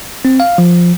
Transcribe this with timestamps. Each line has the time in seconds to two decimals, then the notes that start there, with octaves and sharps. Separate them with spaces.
0.25 C4
0.40 F5
0.58 F3